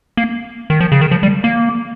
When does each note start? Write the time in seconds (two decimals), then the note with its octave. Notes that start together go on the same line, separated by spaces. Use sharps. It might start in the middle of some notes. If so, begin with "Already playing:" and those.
0.17 A#3
0.70 D#3
0.80 F3
0.92 C#3
1.01 D#3
1.11 F3
1.23 G3
1.44 A#3